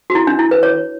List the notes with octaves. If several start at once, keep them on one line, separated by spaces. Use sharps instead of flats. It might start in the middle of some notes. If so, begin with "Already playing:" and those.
F#4
E4
D4
E4
B4
C#5